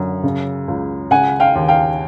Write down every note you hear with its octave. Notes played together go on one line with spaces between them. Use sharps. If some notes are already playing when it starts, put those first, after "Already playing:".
Already playing: F#2 D3
C#3
C#2
C#3 F#5 G#5
F5 G5
D#2
F5 G5